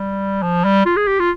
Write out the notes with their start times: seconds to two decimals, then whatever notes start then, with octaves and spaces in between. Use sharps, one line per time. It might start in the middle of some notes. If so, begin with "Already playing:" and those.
Already playing: G3
0.43 F3
0.65 G3
0.86 F4
0.97 G#4
1.07 G4
1.19 F4